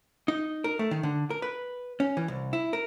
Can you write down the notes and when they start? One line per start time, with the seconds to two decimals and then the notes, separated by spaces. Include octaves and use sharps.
0.28 D#4
0.64 A#4
0.79 A3
0.91 D#3
1.03 D3
1.30 A#4
1.42 B4
2.00 C#4
2.17 E3
2.28 C2
2.53 E4
2.73 A#4